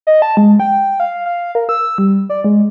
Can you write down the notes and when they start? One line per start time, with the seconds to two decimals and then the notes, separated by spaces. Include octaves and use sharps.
0.07 D#5
0.22 A5
0.37 G#3
0.60 G5
1.00 F5
1.26 F5
1.55 A#4
1.69 E6
1.98 G3
2.30 D5
2.44 G#3